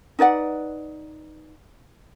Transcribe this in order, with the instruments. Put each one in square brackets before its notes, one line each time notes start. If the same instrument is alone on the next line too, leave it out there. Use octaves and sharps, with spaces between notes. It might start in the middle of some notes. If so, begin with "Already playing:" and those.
[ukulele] D#4 B4 D5 F#5